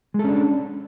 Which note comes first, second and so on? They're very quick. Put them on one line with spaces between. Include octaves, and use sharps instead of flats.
G#3 A4 C#4 D4